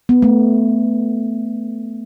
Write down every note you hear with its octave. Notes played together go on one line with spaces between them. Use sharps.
B3
A3